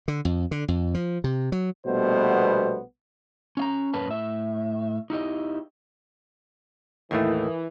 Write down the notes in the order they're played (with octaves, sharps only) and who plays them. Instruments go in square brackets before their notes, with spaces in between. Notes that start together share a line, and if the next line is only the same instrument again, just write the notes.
[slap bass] D3
F2
D3
F2
F3
C3
F#3
[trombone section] A#1 B2 G3 A3 B3 C5
[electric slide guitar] C#4 F5 A#5
F#2 A#3 C#4 B4 A5
A2 E5
D#4 E4 G4 D#5
[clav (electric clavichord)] D#2 A2 A3 [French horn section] E3 [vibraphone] E4 A#4 D#6